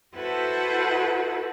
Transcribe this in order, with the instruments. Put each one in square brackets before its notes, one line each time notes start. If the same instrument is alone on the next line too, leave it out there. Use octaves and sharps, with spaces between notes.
[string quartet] E4 F#4 A4 B4 C5 F#5